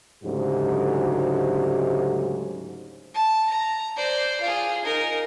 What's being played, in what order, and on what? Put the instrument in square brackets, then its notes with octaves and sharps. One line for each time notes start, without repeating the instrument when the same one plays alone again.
[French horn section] D2 G#2 C#3 F#3 G4
[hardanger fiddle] A5
A#5
C5 D5
F4 G#4
D#4 A#4